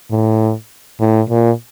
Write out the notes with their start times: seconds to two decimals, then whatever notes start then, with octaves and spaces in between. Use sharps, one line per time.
0.11 A2
1.00 A2
1.30 A#2